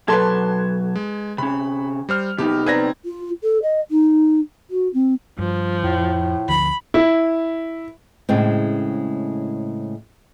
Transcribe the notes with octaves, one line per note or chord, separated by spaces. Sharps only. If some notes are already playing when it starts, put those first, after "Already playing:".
B2 F#3 A4 B4 A5 C6 G#6
G#3
C3 C#4 B5
G3 C5 F6
C3 B3 D#4 G4
C4 B4 D5 A#5 G#6 A#6
F4
A4
D#5
D#4
F#4
C4
G2 F3
F2 A2
D2 D3 F3 B5
E4
A2 C#3 G#3 C4